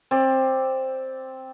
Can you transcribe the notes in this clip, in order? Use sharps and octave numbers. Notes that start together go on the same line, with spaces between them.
C4 D5